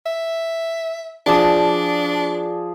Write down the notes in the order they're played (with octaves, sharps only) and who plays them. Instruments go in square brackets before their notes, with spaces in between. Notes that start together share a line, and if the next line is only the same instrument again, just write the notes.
[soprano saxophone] E5
[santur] F3 G#4 D5 [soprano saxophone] D4